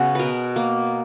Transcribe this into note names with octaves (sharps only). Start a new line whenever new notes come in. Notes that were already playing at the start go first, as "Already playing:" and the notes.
Already playing: C#3 B3 F#4 G#4
B2 A#4 B4
A#3